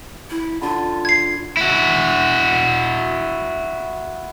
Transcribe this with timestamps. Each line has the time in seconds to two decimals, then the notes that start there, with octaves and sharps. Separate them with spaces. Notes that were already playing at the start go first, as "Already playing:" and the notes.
0.30 E4
0.61 D3 F4 B5
1.05 G#6 C7
1.57 E4 F#4